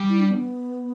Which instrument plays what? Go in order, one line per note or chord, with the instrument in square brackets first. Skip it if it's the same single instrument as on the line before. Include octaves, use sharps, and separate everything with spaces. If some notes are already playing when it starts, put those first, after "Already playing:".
Already playing: [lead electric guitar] G3
[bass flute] E4
D4
B3